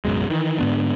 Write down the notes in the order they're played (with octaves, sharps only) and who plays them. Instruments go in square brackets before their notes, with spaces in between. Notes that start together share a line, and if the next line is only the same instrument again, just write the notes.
[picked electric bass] D1 F#2 B2 G#3
D#3 E3
G#2 D3 B3 D4